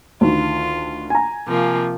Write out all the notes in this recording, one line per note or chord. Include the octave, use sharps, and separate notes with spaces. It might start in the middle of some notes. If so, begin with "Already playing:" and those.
D2 D#3 F4
G#5 A#5
C3 F3 A#3